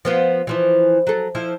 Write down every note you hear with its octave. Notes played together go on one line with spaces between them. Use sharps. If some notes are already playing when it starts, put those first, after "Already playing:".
F3 B3 F4
E3 F3 E4
F#3 A4
F3 E4